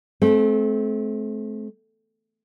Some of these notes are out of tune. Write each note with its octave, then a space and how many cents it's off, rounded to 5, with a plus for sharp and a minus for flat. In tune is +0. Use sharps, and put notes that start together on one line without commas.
A3 -35 C4 +0